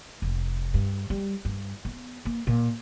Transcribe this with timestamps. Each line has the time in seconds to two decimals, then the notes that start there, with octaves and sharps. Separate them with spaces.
0.22 F1
0.74 G2
1.10 G3
1.45 G2
1.85 B3
2.25 A#3
2.47 A#2